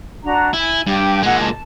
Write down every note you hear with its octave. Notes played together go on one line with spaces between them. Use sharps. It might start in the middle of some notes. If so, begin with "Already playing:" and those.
D4 F#4 A#5
E4 G#5
G2 G4
A#2 G#3 F#5 E6
A5